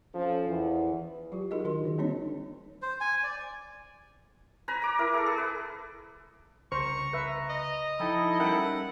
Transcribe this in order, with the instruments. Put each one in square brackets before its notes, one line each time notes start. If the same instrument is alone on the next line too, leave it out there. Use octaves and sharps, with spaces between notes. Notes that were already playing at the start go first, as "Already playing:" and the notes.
[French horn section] F3 C#4 A4
E2 E3
[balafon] F#3 F4 G4
D#4 F4 F#4 G#4 A#4 D#5
D#3 D4 F#4 A#4 C6
D3 D#3 G#4
G3 A#3 C4 D4 D#4 C#5
[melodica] C5
G#5
D5
[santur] B4 G#5 A#5
A#5 D6
E4 A#4
G#4 A4
G#4
B4
[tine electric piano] C2 C#3 [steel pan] C5 [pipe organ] A#5 [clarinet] C#6
[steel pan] B4 E5
[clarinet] D#5
[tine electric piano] F3 G5 [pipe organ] D#4 E4 A4
[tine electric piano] G3 C#4 [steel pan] A#4 E5 G5 [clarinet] F#5